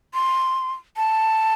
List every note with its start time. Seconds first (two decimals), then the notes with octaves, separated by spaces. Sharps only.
0.14 C6
0.97 A5